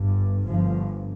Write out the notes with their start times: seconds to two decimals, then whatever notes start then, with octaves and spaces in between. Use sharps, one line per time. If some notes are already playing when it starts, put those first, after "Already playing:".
Already playing: G1 G2
0.47 G1 G2 F3